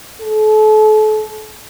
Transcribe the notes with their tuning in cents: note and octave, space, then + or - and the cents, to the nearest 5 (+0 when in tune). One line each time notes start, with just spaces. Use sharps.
A4 -35